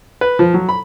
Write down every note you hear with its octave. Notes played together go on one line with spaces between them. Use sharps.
B4
F3
F#3
B5